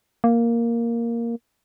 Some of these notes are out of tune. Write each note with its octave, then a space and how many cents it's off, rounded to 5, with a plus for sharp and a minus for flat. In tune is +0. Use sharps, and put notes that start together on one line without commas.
A#3 +0